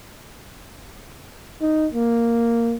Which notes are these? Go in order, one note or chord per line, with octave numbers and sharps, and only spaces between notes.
D#4
A#3